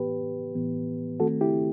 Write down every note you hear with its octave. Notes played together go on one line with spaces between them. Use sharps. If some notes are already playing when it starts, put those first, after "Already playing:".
Already playing: A2 E3 B3 G4 B4
A2 E3 B3
D#3 A3 C4 F#4 A4
E4 G4